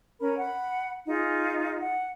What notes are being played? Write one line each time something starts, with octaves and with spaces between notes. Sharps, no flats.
C#4 A#4 B5
F#5 B5
D#4 F4 G#4
F#5